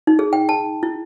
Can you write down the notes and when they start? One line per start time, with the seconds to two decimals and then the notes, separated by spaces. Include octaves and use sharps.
0.07 D#4
0.19 G#4
0.33 G5
0.49 A5
0.83 E4